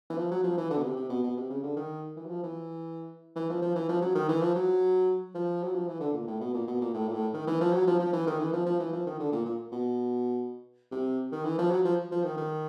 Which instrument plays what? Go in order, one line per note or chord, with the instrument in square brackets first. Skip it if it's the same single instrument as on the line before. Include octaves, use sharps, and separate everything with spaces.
[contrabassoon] E3
F3
F#3
F3
E3
D3
B2
C3
C3
B2
B2
C3
C#3
D3
D#3
E3
F#3
F3
E3
E3
F3
F3
E3
F3
F#3
D#3
E3
F3
F#3
F3
F#3
F3
E3
D3
A#2
A2
B2
A#2
B2
A#2
A2
A#2
A2
D#3
E3
F3
F#3
F3
F3
E3
D#3
E3
F3
F3
E3
F3
D#3
D3
A#2
A#2
B2
C3
D#3
E3
F3
F#3
F3
F3
D#3
D#3